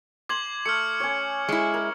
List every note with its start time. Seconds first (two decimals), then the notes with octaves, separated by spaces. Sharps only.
0.29 C6 D6 G#6 F#7
0.66 A3 F6 C#7
1.00 C#4 C#5
1.48 G#3 E4 G#5
1.74 A#4